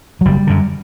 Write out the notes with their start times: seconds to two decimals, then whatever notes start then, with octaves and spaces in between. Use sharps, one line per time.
0.21 F#3
0.25 F#1 G3
0.47 F#2 D3